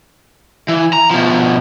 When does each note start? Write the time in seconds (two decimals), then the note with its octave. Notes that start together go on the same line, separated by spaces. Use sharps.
0.68 E3
0.93 A#5
1.11 B2 F3